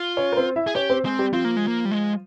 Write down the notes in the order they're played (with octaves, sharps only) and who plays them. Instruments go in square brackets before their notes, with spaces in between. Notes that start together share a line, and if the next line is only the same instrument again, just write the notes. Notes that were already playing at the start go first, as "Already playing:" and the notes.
Already playing: [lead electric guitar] F4
[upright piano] C#4 C#5
A#4
C4 C5
E4 E5
[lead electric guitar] G#4
[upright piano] C#4 C#5 [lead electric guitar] G4
[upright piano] C4 C5
[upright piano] G#3 G#4 [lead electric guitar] C4
[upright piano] G3 G4
[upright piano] F3 F4 [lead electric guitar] C4
[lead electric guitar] A#3
G#3
A#3
G3
G#3